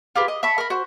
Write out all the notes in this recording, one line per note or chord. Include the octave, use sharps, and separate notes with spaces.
F4 G4 G#4 B4
D#5
E5 A5 B5 C#6
A#4 B5
F#4 C5